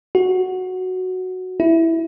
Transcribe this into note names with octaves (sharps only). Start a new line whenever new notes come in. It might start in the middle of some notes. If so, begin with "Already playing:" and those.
F#4
E4